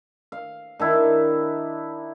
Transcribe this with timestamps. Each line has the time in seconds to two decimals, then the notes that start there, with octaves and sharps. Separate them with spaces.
0.32 F5
0.79 D#3 D4 E4